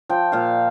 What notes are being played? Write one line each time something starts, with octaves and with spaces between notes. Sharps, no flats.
F3 G5
A#2 F5